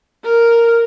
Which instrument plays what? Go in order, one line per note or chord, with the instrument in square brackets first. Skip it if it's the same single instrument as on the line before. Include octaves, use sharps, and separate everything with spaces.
[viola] A#4